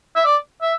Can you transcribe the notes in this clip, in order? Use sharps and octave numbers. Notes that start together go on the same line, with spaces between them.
E5
D5
E5